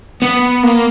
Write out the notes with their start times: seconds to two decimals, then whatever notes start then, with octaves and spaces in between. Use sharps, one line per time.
0.22 B3
0.63 A#3